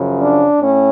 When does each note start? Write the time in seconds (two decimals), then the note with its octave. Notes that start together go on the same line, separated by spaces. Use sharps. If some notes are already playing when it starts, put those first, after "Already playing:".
Already playing: F#2 C#3 F3
0.20 D4
0.61 A2 C#4